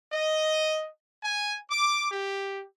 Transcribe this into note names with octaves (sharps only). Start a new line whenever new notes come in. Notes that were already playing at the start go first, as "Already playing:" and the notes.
D#5
G#5
D6
G4